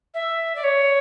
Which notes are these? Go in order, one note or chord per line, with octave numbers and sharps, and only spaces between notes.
E5
D5
C#5